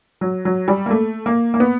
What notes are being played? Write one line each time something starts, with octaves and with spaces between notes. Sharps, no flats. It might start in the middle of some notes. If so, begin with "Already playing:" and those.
F#3
F#3
G3
A#3
A3
A#3
A#3
B3